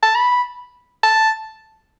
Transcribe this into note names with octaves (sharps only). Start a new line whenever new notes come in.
A5
B5
A5